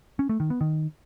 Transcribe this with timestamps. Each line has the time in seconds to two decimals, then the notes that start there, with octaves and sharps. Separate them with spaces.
0.19 C#4
0.29 A3
0.40 D#3
0.50 B3
0.61 D#3